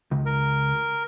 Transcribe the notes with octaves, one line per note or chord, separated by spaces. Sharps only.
C#2
A#4